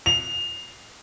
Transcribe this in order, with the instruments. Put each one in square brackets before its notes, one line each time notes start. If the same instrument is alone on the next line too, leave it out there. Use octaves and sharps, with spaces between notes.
[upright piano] F7